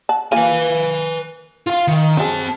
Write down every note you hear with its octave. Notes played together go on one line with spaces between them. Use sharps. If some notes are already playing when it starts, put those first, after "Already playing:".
F#5 A5
A#3 F4 B4 F5 G#5
F4 F5
D#3
F#3 C4 G#4 A5